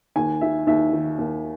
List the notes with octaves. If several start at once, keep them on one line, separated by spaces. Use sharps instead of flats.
D#2 G#5
D#3 E5
D#2 E5
D#3
D#2